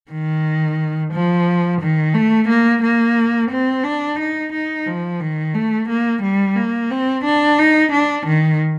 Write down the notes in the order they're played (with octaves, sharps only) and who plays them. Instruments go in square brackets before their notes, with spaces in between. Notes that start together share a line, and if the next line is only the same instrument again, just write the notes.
[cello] D#3
F3
D#3
A3
A#3
A#3
C4
D4
D#4
D#4
F3
D#3
A3
A#3
G3
A#3
C4
D4
D#4
D4
D#3